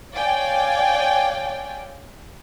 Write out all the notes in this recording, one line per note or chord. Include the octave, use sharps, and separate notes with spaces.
C#5 D5 F5 G5 G#5